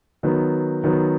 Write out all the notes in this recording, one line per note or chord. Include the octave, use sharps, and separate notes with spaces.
D#3 F#3 B3
D#3 F#3 B3